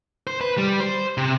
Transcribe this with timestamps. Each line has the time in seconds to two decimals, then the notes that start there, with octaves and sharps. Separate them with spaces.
0.27 C5
0.41 B4
0.58 G3
0.80 C5
1.17 C3